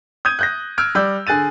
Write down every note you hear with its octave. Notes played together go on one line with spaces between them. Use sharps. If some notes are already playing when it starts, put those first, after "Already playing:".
D#6 G6 G#6 D#7
F#6 G6 A#6
E6 F6 G#6 D7
G3 D5 E6 G6
D3 G#4 F#6 A6 D#7